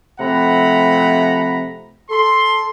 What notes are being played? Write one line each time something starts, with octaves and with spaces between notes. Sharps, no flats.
C3 F3 A3 F#5 A#5 B5
A4 C6